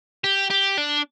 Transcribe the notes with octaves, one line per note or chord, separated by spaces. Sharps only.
G4
G4
D4